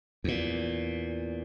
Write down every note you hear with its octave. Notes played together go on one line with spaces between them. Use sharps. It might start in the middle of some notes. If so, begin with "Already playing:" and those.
E2 A#2